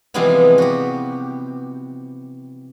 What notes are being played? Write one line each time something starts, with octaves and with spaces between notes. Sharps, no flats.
C3 E3 F3 G3 G#3 B3
F#4 G4